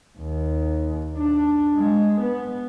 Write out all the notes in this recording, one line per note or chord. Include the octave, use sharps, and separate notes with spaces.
D#2
D4
G#3
B3